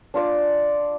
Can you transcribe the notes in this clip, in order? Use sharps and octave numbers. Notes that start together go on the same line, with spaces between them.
D4 F4 D5